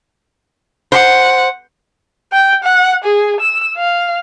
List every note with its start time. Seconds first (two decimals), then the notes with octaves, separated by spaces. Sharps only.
0.92 C5 F#5
2.33 G5
2.64 F#5
3.05 G#4
3.41 E6
3.77 F5